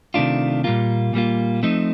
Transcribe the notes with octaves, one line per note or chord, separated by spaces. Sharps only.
C3 D#3 A3 D4 F4
A#2 G3 A#3 F4
A#2 G3 A#3 F4
F3 A3 C4 D#4